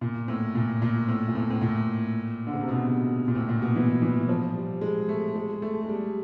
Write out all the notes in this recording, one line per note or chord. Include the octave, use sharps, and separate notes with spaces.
A#2
A2
A#2
A#2
A2
A#2
A2
A2
A#2
D3
C#3
C3
B2
A#2
A2
A#2
B2
E3
E3
F3
G3
G#3
A3
G#3
A3
G#3
G3